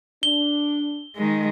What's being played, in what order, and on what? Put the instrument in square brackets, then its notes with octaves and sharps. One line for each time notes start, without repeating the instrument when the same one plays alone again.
[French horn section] D4 [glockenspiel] G7
[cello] D#3 G#3